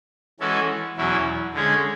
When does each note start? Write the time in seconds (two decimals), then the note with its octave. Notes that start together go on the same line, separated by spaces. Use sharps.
0.40 E3 G#3 C#4 F#4 A4
0.96 E2 B2 F#3 C#4 E4
1.53 D3 G#3 C#4 G#4